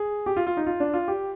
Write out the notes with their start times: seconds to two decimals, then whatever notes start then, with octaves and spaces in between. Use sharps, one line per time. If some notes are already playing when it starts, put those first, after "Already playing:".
Already playing: G#4
0.26 G4
0.37 F4
0.47 F4
0.57 D#4
0.67 F4
0.80 D4
0.94 F4
1.08 G4